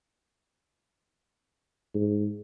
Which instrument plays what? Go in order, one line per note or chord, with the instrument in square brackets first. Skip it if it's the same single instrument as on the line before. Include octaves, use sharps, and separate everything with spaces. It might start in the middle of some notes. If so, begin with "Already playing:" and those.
[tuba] G#2